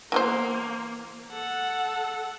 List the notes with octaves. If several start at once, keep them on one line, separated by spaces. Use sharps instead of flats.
E3 A#3 B3 C5
A4 F#5